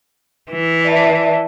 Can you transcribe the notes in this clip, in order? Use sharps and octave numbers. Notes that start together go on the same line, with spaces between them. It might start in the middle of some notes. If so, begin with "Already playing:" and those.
E3
D5 E5 A5